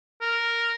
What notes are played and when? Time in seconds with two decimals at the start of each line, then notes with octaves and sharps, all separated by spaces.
0.21 A#4